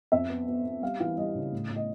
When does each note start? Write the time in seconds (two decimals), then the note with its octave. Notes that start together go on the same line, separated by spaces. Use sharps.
0.12 F2 E5
0.29 B3
0.48 B3
0.65 B3
0.82 G3 F5
1.00 E3 F5
1.17 G3 D#5
1.35 C#3
1.52 A2
1.70 A2
1.76 D#5